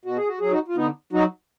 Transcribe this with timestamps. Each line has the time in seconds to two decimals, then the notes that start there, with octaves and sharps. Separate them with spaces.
0.05 B2 F#4
0.17 G#4
0.27 F#4
0.40 F#3 G#4
0.51 D#4 F#4
0.68 F4
0.76 D3 B3 D#4
1.13 F#3 D#4 F#4